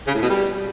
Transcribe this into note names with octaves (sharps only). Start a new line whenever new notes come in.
C#3
A2
B2
G3